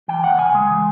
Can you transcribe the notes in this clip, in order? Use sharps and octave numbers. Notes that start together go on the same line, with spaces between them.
E3 G5
D#2 F#5
C#3 G#5
G#3
E3